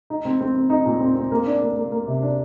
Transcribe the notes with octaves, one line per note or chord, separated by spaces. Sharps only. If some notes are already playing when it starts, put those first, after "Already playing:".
D#4
C4
C4
C4
D#4
A#2
C4
C4
A#3
D4
A#3
A#3
A#3
C3
D4